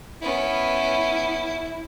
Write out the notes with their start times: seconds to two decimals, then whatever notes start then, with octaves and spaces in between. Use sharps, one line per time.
0.22 B3 C#4 E4